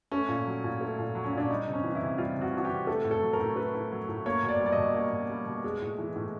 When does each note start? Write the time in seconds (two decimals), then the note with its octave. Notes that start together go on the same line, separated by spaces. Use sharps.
0.12 A3 C#4
0.28 A#2
0.47 F#3
0.64 A#2
0.81 A3
0.99 A#2
1.15 F#3
1.25 C#4
1.33 A#2 D4
1.50 G3 D#4
1.67 C3
1.73 C#4
1.84 E3
1.95 E4
2.02 C3
2.18 G3 F4
2.37 C3 F#4
2.53 E3 F#4
2.65 G4
2.70 C3
2.87 A3 A4
3.04 A2
3.11 A4
3.22 F#3
3.33 A#4
3.40 A2
3.56 A3 B4
3.75 A2
3.92 F#3
4.09 A2
4.26 A#3 C#5
4.43 B2
4.48 D5
4.60 G3
4.66 D5
4.72 B2 D#5
4.94 A#3
5.13 B2
5.30 G3
5.46 B2
5.64 G#3
5.82 A2
5.98 E3
6.16 A2